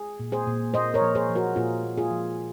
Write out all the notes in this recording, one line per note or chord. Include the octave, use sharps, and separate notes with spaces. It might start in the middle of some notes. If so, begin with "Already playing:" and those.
Already playing: G#4
A#2
G#4 C5
A#2
A#3 C5 D#5
A#4 C#5
F3
G#4 C5
F3
F#4 A#4
A#2 F4 G#4
A#3
F4 G#4
F3